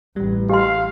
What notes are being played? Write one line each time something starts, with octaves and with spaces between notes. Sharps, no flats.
A1 G3
G4 D#5 F5 C6